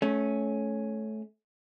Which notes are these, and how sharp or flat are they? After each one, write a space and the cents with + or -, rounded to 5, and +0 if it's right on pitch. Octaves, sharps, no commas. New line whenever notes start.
A3 -20 C#4 +0